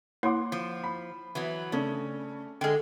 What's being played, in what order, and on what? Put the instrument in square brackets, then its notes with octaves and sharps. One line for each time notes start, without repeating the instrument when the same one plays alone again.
[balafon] A#3 E4 C#5 [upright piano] F#5 C6 D6
[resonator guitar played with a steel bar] F3
[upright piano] B5
[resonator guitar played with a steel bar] E3 F#3 B3
[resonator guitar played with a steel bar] C#3 [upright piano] A3 C#4 D4
[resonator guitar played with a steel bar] D3 G#3 [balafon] A4 G5